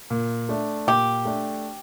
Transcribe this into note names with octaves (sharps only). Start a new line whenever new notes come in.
A#2
A3 D4
A#2 G4
A3 D4